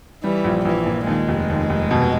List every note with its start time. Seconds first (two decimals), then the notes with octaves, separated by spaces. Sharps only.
0.24 E3 G3
0.44 A#1
0.65 A#1 E3
0.86 A#2
1.07 D#2 G#3
1.28 F1
1.50 D#2
1.70 F1
1.91 B2